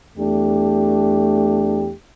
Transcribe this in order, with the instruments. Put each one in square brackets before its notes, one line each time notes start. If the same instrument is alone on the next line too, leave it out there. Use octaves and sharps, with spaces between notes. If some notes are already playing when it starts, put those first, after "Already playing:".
[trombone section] E2 A3 D4 G4